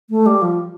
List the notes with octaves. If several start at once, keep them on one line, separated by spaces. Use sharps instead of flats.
A3
G3
F3